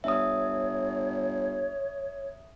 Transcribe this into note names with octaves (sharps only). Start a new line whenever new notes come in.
G1 C#5 E5 D#6